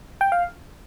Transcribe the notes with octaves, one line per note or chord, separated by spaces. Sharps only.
G5
F5